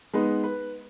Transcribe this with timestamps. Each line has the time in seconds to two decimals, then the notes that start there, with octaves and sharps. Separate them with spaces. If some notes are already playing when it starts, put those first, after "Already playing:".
0.14 G#3 B3 D#4 B4
0.44 B4